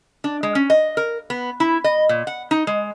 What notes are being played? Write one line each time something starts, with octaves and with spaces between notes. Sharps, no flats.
D4
G#3
C#4
D#5
A#4
B3
E4
D#5
A#2
F#5
D#4
G#3